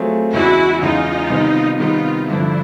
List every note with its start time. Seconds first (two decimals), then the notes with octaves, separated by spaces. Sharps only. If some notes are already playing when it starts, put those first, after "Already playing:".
Already playing: F#3 A3 C4 F4 G#4
0.32 E2 C#3 E3 G#3 E4 F#4
0.81 E2 C#3 E3 G#3 D#4 F4
1.30 C3 D#3 G3 B3
1.79 C3 D#3 G3 B3 D#4 F4
2.28 G2 D3 F3 D4 E4